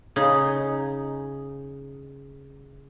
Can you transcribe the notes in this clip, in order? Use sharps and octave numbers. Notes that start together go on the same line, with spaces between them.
C#3 D#4